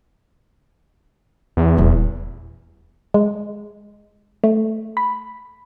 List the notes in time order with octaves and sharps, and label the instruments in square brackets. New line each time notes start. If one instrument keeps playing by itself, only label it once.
[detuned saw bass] E2
[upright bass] D#1 E4
[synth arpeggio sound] G#3
A3
B5